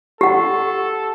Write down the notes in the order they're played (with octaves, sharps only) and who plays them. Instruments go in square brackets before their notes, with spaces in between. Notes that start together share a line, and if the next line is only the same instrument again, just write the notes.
[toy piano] G4 F#5 [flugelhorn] A4